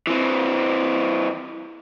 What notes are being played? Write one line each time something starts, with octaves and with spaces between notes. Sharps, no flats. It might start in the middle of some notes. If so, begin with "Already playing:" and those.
E3 C4